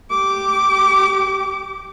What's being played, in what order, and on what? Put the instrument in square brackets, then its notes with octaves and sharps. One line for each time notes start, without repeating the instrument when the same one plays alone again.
[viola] G4 D6